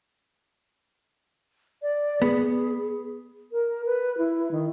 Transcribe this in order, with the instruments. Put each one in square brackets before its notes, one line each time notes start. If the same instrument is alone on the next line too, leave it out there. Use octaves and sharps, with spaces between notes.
[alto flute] D5
[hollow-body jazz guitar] B3 [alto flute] G#4
[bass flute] A#4
B4
E4
D#3